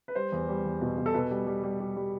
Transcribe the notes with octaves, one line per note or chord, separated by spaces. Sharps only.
B4
G3 C5
E2
G3
E2
B2
B2
A4
B2 B4
G3
G3
G3
G3
G3